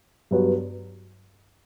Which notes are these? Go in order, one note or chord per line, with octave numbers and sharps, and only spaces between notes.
G2 F#3 B3 F#4